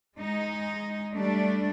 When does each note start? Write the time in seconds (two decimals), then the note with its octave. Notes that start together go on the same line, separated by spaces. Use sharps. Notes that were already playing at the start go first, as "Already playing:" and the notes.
0.17 G#3 D#4
1.15 G3 A3 D4